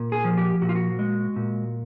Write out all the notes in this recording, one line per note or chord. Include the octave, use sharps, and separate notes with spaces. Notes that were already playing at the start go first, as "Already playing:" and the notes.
Already playing: A#2
G#4
F3
G4
A#2 F#4
F4
F#4
G#3
A#2